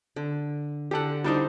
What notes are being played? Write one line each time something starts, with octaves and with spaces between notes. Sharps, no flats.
D3
D3 G4 A4 F#5
G3 D4 D#4 C5 G5 A5